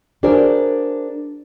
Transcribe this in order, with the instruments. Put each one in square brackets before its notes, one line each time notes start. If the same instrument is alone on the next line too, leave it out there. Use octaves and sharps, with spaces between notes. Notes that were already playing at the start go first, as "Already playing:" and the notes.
[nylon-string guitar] D4 F#4 G#4 A#4 C5 D5